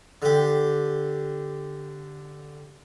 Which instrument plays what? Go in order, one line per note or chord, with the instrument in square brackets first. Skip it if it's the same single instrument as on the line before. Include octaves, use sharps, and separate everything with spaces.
[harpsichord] D3 G4